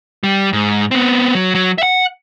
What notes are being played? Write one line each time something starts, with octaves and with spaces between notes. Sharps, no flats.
G3
G#2
B3 C4
F#3
F#3
E5 F#5